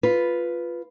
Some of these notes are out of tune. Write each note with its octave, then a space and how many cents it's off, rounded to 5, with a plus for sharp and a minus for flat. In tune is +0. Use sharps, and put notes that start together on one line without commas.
F4 +0 B4 +0